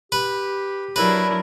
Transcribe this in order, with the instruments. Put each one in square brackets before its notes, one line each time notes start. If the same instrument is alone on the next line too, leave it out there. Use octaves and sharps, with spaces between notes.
[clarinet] G4 [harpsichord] B4
[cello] F#3 D4 [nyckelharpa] E4 A#4 [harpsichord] B4